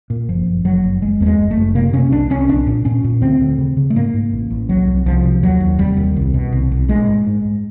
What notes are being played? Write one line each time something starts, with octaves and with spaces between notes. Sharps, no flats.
A#2
F#1 F3
F#1
F#1 F#3
F#1
F#1 G#3
E2 A3
G#3
F#1
A3
F#1
C3 A#3
C3 C#4
C2 D4
C2 C#4
A#1 D4
A#2
A#2 C#4
A#2
D2 C4
D2
C#3
C#3
A3
G#2 A#3
G#2
A1
A1
C2 F#3
C2
C2 F3
C3
D#2 F#3
D#2
F1 G3
D#2
C2
B2
C2
C2
A#1 G#3
G#2
G#2
G#2